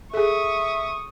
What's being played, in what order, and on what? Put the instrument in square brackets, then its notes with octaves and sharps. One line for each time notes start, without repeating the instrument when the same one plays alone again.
[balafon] G#4 A4 [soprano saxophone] E5 [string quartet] C#6 D#6